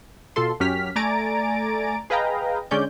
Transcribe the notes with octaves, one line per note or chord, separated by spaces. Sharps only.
B2 F4 A4 C6
F#2 F#3 C#4 G4 F6 B6
A3 D5 G#5 A#5 A6 D7
G#4 B4 D#5 F5 G5 A#5
D3 G#3 C#4 D5 G6